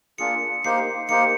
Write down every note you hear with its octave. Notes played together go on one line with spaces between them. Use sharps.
A#3 D4 F4 G#4 C#7
A#3 D#4 G4 C5 C7
A#3 D#4 G4 C5 C#7